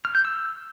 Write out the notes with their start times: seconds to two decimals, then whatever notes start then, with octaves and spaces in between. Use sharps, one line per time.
0.05 F6
0.15 G6
0.25 E6